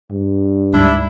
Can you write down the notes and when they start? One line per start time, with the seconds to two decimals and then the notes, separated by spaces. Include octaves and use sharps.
0.11 G2
0.73 D2 G#2 G3 D4 E4